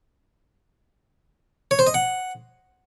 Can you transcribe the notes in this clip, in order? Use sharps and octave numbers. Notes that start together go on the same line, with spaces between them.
C#5
C5
D#5
F#5